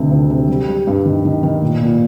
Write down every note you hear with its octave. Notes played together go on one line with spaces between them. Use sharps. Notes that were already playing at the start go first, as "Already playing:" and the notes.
Already playing: D2 C3 D#3
D2
C3
G3
G3
G2
D#3
D#3
D#3
A#2
A#2